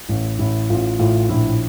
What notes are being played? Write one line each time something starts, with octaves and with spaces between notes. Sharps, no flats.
A1
A1 E4
A1 F4
A2 F4
A#1 E4